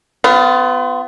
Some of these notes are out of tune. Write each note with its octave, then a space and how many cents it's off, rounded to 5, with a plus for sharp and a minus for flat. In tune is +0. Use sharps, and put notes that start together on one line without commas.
B3 +35 F4 +0